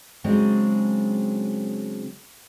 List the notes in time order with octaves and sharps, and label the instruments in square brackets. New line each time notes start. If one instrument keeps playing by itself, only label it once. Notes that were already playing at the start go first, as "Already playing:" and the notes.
[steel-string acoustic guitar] C#3 F#3 G#3 C4 D4